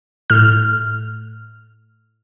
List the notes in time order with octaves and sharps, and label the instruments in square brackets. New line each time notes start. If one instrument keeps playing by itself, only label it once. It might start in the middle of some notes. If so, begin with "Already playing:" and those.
[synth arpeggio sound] A2 F6